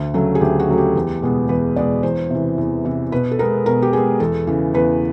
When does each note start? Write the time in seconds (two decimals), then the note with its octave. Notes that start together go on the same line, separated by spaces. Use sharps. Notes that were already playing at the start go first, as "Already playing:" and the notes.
Already playing: D2
0.14 C#3 F#3 A3
0.35 G#4
0.41 D2 G4
0.60 F#4
0.68 C#3 F#3 A3
0.78 G4
0.95 E2
1.22 B2 G#3 B3
1.49 E2 B4
1.76 B2 G#3 B3 D5
2.03 E2 C5
2.31 C3 E3
2.58 E2
2.85 C3 E3
3.12 B2 B4
3.31 A4
3.39 G#3 B3 A#4
3.66 B2 A#4
3.82 G4
3.93 G#3 B3 G#4
4.20 E2 A4
4.47 C#3 E3
4.74 E2 B4